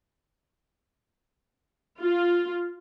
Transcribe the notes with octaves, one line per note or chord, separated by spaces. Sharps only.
F4